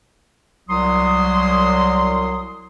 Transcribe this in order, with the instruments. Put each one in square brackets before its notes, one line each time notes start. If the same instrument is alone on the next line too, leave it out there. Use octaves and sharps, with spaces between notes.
[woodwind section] C2 F#3 C6 D#6